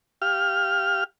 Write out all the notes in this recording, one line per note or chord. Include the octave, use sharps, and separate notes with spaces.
G4 F5 F6